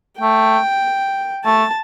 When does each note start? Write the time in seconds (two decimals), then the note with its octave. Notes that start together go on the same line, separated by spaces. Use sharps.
0.20 A3 G5
1.45 A3 A5